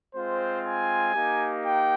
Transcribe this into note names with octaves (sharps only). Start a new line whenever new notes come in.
G#3 C4 F4 C5
G#5
A#3 D#4 G4
G5